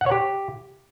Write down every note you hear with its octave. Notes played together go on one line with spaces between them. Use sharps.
F#5
C#5
G4